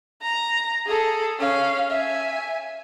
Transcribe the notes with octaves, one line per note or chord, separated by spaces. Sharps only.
A#5
G#4 A4
C#4 F5
E5 G#5